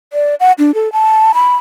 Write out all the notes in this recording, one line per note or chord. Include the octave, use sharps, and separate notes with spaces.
D5
F#5
D4
A4
A5
B5